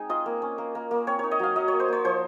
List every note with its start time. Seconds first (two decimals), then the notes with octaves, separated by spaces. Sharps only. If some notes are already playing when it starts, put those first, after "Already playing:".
Already playing: G#3 C4 D#4 G#5
0.09 F4 D#5
0.26 A#3
0.42 C#4
0.58 A#3
0.75 A#3
0.91 A#3
1.07 C4 C#5
1.19 D#4 C#5
1.31 D#5
1.39 F#3 F5
1.56 F#3 D#5
1.68 A#3 C#5
1.80 C5
1.88 A#3 C#5
2.05 F3 C5